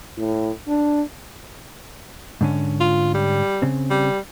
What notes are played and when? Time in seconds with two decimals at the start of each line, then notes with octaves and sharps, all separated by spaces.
0.18 A2
0.68 D4
2.41 G#2 D3 C#4
2.80 F4
3.14 G3
3.62 C#3 C4
3.90 G3